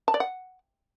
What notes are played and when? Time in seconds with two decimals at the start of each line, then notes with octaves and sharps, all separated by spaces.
0.08 A5
0.14 D5
0.20 F#5